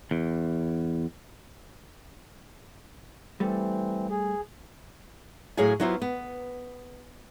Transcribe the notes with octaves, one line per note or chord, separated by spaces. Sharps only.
E2
E3 G3 A3 C4
G#4
A2 F#3 G#4 C#5 F5 G#5
F#3 B3 E4 F4 C5
B3